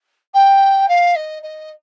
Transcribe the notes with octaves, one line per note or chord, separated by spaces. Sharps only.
G5
F5
D#5
D#5